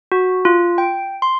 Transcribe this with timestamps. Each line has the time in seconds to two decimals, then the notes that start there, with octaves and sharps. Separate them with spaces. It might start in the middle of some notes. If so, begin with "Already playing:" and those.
0.12 F#4
0.45 F4
0.78 G5
1.22 C6